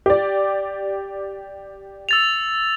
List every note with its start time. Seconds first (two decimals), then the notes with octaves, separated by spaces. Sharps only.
0.06 G4 D5
2.09 E6 A6 F7